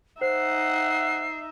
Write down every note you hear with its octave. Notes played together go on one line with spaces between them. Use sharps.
D#4 C5 E5 F#5 C7